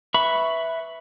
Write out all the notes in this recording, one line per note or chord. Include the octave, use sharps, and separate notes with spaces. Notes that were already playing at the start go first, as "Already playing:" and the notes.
B4 E5 B5 C#6